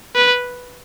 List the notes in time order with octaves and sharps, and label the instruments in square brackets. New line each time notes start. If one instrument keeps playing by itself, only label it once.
[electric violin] B4